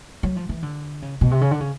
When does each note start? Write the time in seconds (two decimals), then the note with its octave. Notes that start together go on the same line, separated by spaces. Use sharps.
0.23 F#3
0.36 F3
0.49 E3
0.63 D3
1.02 C#3
1.21 B2
1.31 C3
1.41 C#3
1.51 D3
1.60 C#3